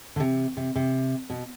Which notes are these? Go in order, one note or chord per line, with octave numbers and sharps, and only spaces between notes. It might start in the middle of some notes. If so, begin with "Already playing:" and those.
D3
C3
C3
C3
B2